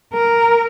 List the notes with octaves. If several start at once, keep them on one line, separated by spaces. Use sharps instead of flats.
A#4